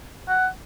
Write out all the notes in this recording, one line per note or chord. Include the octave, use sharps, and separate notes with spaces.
F#5